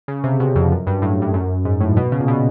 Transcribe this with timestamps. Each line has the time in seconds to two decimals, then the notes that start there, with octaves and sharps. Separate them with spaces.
0.08 C#3
0.24 C3
0.40 B2
0.55 F2
0.71 F#2
0.87 G2
1.02 A2
1.22 G2
1.34 F#2
1.65 G#2
1.80 A2
1.97 B2
2.12 C#3
2.20 A#2
2.28 B2